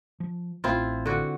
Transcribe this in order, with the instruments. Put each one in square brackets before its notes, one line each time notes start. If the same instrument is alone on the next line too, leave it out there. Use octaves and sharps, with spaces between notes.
[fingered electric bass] F3
[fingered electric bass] A1 [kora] C4 E4 F4
[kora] D3 F#4